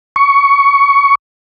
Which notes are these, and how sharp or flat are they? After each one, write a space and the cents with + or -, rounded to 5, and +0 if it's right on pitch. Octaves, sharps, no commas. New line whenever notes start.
C#6 +15